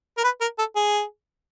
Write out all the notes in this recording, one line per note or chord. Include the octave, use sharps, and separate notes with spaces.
A#4
B4
A#4
A4
G#4